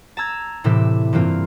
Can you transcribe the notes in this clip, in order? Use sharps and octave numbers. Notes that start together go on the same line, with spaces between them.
A5 A#5 E6 G#6
A2 C3 E3 G4 E5
G2 E3 A#3 C4 F4